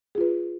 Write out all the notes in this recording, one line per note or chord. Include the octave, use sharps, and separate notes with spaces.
F4 G#4 B4